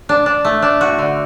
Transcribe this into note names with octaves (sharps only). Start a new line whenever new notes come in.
D4
D4
A3
D4
F#4
D3